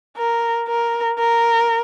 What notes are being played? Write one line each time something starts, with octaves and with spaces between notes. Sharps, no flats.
A#4
A#4
A#4